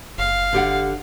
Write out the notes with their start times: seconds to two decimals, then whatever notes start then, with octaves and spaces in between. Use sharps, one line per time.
0.18 F#1 F5
0.53 D3 G4 F#5